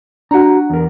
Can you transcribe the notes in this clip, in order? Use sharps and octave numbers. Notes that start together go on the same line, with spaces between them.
D4 F#4 F#5 A#5
E2 A#4